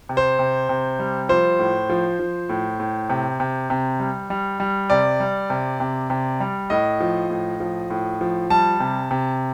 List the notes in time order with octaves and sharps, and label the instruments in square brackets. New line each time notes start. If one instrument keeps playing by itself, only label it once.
[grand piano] C3
C5
C3
C3
G3
F3 C5
A2
F3
F3
A2
A2
C3
C3
C3
G3
G3
G3
C3 D5
G3
C3
C3
C3
G3
A2 D#5
F3
A2
F3
A2
F3
G3 A5
C3
C3